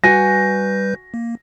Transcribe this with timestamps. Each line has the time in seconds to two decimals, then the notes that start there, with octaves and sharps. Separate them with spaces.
0.04 G3 F#4 B4 G#5 G6 A#6
1.14 A#3